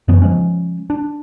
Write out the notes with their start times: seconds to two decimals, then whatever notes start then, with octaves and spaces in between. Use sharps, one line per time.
0.08 F#2 E3 B3 C#4
0.22 C#3 F3 G#3 C#4
0.90 D4